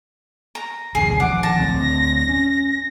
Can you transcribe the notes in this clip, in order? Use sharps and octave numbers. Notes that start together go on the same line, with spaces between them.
A#5
E1 A1 D2 G#4 C7
A#1 D#3 F3 F#5 D6
A5 A#6
D2 C4
C#4